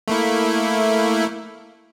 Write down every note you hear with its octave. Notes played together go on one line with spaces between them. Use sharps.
A3 A#3 E4